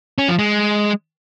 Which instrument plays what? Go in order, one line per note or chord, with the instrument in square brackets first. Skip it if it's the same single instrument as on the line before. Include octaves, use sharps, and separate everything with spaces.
[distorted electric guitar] C#4
F3
G#3